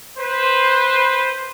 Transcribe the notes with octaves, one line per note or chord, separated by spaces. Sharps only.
B4 C5